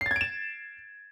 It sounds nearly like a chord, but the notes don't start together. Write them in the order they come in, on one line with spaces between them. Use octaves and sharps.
C7 A6 G#6 D7 E7